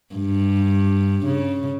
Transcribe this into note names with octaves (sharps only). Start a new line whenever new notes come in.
G2
C#3